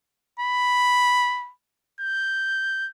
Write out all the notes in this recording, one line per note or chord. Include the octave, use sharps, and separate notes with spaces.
B5
G6